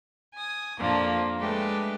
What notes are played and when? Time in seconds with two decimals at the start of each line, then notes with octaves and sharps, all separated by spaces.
0.34 G#5 D#6
0.79 F2 A#2 F3 A#3 D4
1.39 G#3 A3 D4 G4 B4